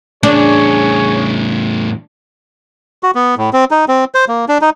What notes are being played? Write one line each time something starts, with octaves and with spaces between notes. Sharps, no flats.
E2 A2 D4 G#4 C#5
F#4
B3
A2
C4
D#4
C4
C5
A#3
D4
D#4